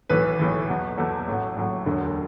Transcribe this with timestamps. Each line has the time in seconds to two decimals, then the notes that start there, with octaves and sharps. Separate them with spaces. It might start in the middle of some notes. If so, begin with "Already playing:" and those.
0.09 B1 A2 E3 B4
0.39 B1 A2 E3
0.68 E2 B2 F#3
0.97 E2 B2 F#3 A4
1.27 A1 A2 F#3
1.56 A1 A2 F#3
1.86 E1 D2 D3 F#3